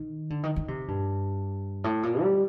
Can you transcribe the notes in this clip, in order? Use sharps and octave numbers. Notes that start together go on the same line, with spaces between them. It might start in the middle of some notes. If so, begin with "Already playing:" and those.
Already playing: D#3
D3
D#3
D#3
C3
G2
A2
A#2
G3